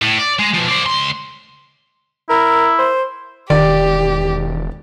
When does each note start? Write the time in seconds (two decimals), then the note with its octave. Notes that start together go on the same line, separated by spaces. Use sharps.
0.02 A2
0.19 D5
0.39 G#3
0.54 B2 F3
0.68 C5 D5
0.86 C#2 C6
2.29 E4 A#4
2.78 C5
3.50 E1 D#3 G4 D5